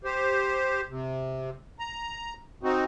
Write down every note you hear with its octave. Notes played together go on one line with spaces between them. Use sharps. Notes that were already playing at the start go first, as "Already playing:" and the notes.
G4 C5
C3
A#5
C4 D#4 F#4